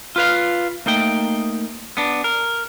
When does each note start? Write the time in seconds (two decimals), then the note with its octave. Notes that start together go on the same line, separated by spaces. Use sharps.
0.16 F4 B4 F5
0.86 A3 A#3 D#4 G5
1.97 B3 D4
2.24 A#4